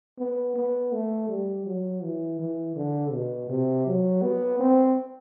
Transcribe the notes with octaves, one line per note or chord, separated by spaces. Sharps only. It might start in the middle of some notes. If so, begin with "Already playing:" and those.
B3
B3
A3
G3
F#3
E3
E3
D3
B2
C3
F#3
B3
C4